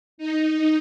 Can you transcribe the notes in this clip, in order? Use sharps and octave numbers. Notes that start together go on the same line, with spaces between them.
D#4